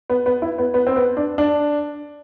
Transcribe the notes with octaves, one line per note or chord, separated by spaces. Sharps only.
B3
B3
E4
B3
B3
C4
B3
D4
D4